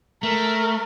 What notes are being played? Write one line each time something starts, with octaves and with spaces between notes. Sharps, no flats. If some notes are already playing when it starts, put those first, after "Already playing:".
A3 A#4